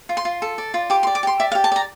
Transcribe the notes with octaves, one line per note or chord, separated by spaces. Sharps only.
F4
C6
F4
A4
D5
F4
G4 D6
C6
D5
D6
G4 C6
D5 E5
F5
G4
A5
D5 A#5